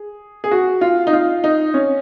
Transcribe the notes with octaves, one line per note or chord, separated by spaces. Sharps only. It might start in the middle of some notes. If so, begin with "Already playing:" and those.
Already playing: G#4
G#4
F#4
F4
D#4
F4
D#4
C#4